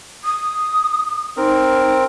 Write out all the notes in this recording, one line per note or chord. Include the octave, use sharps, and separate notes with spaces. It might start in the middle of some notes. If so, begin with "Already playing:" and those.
D#6
C4 D#4 A#4